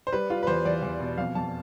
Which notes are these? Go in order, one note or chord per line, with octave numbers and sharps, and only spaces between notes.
C5
G3 B4
G3 F4
B4
E2 C5
E2 D5
E2
B2
F2 F5
F2 A5